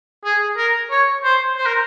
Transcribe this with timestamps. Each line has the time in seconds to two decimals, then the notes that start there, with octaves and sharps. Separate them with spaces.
0.25 G#4
0.57 A#4
0.91 C#5
1.24 C5
1.57 C5
1.65 A#4